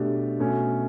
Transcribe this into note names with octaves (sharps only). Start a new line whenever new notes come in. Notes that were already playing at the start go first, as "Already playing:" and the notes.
Already playing: B2 A3 D4 G4
B2 A3 C#4